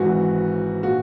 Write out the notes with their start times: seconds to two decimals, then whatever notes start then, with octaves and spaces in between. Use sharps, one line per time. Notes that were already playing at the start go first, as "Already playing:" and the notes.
Already playing: G#1 G#2 E3 F#4
0.83 A#2 F#4